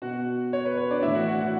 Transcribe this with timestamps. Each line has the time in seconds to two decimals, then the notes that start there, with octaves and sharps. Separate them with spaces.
0.02 B2 F#4 F#5
0.53 C#5
0.65 B4
0.77 C#5
0.90 D4 D5
1.02 A2 E3 E4 E5
1.15 F#4 F#5
1.28 F#4 F#5
1.40 F#4 F#5